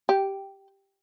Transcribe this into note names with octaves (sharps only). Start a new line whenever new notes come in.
G4